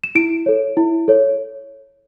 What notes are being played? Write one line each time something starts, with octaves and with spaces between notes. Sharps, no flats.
E7
E4 D7
A4 C#5
E4
A4 C#5